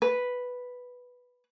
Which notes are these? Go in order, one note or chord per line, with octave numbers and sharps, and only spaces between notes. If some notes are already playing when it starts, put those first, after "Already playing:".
B4